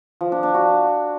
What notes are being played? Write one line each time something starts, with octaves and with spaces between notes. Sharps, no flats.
F3
D4
D4
F#4